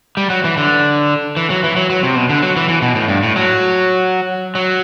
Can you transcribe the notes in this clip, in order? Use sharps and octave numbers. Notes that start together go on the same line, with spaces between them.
G3
F#3
E3
D3
E3
F#3
E3
F#3
F#3
C3
B2
D3
F#3
E3
E3
B2
A2
G2
A2
F#3
F#3